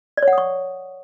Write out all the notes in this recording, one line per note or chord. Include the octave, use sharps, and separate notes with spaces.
D5
C#5
F#5
D#6
C#6